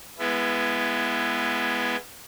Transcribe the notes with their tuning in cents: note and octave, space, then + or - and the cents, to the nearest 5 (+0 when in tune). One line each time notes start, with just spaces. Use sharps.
G#3 +0 B3 +0 E4 +20